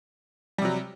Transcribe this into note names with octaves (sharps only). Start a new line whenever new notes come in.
C3 F#3 G3